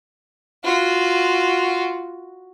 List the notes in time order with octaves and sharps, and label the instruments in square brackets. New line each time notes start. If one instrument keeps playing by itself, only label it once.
[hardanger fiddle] F4 F#4